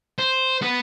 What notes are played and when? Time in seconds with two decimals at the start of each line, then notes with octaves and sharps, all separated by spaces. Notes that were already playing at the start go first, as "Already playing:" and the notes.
0.18 C5
0.62 B3